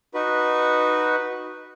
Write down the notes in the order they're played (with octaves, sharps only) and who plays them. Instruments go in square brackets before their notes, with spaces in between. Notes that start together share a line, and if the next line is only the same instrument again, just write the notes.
[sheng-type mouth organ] D#4 F#4 B4